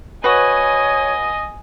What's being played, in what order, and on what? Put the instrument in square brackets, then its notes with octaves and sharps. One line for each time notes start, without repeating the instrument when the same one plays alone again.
[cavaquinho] F#4 B4 [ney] C#5 [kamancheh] D#5 [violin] G#5